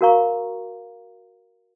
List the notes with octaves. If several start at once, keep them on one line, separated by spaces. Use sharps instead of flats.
F#4 A#4 F5 A#5 C#6